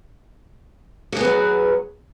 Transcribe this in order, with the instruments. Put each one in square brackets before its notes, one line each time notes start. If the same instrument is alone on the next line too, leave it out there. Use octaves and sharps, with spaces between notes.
[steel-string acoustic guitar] F#4
G#4
B3
F#3